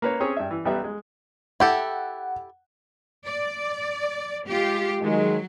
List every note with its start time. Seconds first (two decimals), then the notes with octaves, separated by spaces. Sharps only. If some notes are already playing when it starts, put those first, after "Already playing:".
0.02 A#3 B4 C#5
0.20 C4 C#4 G#4 C#5
0.37 G2 E5
0.51 E3
0.65 B1 G3 B3 E5
0.84 G#3
1.60 E4 G4 A4 F#5
3.26 D5
4.48 G#3 F4 G4
5.02 D#3 F#3 G#3